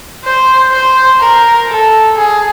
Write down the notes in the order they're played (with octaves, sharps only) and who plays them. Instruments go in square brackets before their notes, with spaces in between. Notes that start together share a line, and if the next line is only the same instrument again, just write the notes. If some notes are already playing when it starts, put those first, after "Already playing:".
[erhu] C5
C5
A#4
A4
G#4